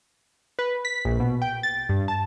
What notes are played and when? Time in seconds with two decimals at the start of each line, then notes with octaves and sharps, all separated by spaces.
0.59 B4
0.85 B6
1.05 A#1
1.20 B2
1.42 G5
1.63 A6
1.89 G2
2.08 A5